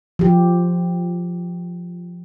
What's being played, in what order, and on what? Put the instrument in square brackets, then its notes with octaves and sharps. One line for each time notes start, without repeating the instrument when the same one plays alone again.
[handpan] F3 G4